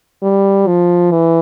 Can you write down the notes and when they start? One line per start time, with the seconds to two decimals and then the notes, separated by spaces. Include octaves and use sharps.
0.23 G3
0.67 F3
1.11 E3